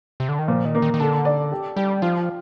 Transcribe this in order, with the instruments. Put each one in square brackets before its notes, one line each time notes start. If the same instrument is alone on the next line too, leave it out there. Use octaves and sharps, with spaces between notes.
[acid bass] C3
D3
D#3
[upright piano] A#2 [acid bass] F3
[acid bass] D#3
[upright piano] A#3
[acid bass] D#3
D#3
[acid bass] D3 [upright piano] A4
[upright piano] D5
G4
[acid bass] G3 [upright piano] G4
[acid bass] F3 [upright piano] F4